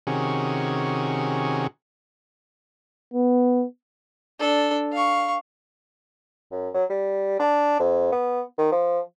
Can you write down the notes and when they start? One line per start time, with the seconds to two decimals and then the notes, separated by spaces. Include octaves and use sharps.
0.07 C3 D#3 C#4 F#4 G#4
3.13 B3
4.40 D4 A4
4.93 F5 C#6
6.52 F#2
6.74 F#3
6.90 G3
7.39 D4
7.79 F2
8.12 B3
8.58 D#3
8.72 F3